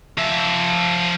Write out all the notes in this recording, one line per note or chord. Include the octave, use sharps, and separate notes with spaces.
F3 E5